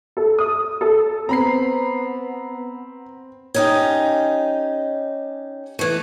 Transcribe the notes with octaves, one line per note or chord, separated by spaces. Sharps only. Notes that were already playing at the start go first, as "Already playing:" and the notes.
A4
D#6
A4
B3 C4 A#5 B5 C7
C#4 D#4 G4
E3 A3